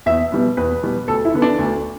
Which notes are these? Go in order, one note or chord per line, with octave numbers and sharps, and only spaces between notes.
E2 E5
B2 G3 B3
E2 B4
B2 G3 B3
D2 A4
E4
D3 B3
D4
D2